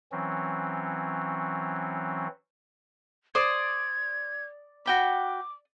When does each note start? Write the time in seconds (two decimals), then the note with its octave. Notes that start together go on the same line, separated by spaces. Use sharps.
0.12 E3 F#3 C4 C#4
3.35 C5 D5 D#6 G#6
4.86 F#4 G5 B5 D6